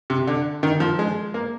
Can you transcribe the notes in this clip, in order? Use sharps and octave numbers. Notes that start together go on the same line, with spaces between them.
C3
D3
D#3
F3
G#3
A#3